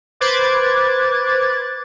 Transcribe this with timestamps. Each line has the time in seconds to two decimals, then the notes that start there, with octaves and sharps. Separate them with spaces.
0.21 B4 C5 D6 F#6 G#6 A6